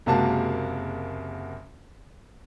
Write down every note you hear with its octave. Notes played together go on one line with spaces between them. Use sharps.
F#1 C3 G#3 A#3 F#4 A5